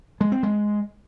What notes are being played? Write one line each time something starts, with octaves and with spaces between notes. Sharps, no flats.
G#3
C4
G#3